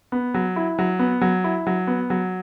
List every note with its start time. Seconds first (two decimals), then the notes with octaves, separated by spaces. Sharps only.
0.12 B3
0.34 F#3
0.56 E4
0.79 F#3
0.99 B3
1.21 F#3
1.44 E4
1.67 F#3
1.87 B3
2.10 F#3